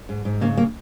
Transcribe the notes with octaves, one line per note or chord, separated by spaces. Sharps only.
G#2
G#2
C#3 A#3
A#3